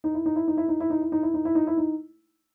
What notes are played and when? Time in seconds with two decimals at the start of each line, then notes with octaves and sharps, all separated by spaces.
0.04 D#4
0.14 E4
0.26 D#4
0.36 E4
0.48 D#4
0.57 E4
0.68 D#4
0.80 E4
0.90 D#4
1.01 E4
1.12 D#4
1.23 E4
1.34 D#4
1.45 E4
1.55 D#4
1.67 E4
1.77 D#4